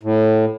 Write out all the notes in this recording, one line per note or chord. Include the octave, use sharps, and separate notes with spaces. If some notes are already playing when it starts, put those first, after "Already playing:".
A2